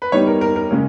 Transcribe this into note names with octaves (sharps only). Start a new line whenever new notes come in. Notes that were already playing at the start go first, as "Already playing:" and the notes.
B4
G3 B3 D#4 C#5
A#4
A#4
A#4
C#3 G#3 C#4